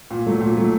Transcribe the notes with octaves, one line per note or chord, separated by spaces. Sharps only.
A#2
F#3 A3
A#2
F#3 A3